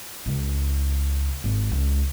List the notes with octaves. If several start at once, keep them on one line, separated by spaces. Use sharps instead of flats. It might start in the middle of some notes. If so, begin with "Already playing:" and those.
C#2
G#1
C#2